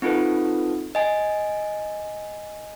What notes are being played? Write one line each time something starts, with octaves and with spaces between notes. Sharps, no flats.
C4 D#4 F4 A4 B4
D#5 G#5